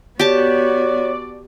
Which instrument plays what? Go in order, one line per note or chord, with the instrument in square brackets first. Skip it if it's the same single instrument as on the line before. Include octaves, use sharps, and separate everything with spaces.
[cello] B3 F#4 [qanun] G4 A5 [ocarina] C#5 [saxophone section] D5